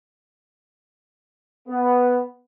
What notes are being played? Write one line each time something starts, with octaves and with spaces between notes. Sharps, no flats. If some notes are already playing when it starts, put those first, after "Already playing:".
B3